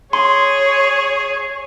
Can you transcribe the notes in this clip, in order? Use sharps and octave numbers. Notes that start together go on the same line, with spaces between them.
G#4 C#5 C6